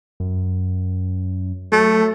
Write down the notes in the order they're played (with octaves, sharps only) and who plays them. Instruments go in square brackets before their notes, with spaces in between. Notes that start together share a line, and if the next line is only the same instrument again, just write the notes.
[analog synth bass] F#2
[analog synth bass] F#3 [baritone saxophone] A3